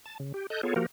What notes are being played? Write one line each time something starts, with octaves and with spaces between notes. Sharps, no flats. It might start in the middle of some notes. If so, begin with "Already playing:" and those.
A5
C#3
G4
A4 D#5 F#6 G6
B3 F4 G#4 A4 C#5
F3 A#3 F#4 G4 A#4